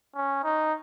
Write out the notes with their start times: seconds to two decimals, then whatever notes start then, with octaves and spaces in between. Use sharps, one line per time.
0.15 C#4
0.44 D#4